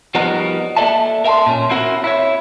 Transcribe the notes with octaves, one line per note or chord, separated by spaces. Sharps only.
F3 G3 B3 D#4 F#4 A#4
A#3 A4 A#4 D5 E5 A5
A#4 E5 F#5 A5 C6
A#2 C#4
C4 C#4 E4 F#4 A4 A#4
E4 C#5